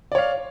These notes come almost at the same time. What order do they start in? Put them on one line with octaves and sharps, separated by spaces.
D5 C#5 F5